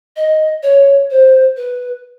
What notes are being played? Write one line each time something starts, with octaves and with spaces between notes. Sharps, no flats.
D#5
C#5
C5
B4